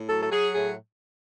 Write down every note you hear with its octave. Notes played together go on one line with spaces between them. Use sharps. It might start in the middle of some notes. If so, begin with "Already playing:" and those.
Already playing: A2
F#3 A4
A4
F#3 G#4
A2 G#4